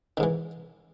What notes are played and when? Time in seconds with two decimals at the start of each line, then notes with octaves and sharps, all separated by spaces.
0.17 D#3
0.20 G#2
0.23 E3